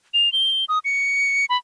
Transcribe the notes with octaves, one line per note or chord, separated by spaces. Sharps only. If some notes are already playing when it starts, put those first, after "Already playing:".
F7
G7
D#6
C#7
B5